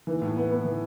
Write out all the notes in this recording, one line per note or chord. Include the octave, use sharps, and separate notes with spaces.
E3
A2
B3
B3
E3